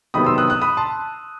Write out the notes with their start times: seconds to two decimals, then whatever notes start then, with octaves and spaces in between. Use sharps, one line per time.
0.14 C3 D#3 F#3 B3 B5 D#6
0.26 C6 E6
0.38 D#6 F#6
0.50 D#6 F#6
0.62 B5 D#6
0.77 A5 C6